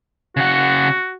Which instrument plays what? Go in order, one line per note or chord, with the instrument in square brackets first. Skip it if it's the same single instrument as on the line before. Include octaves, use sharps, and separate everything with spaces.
[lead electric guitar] C#3 F#5 [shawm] F#4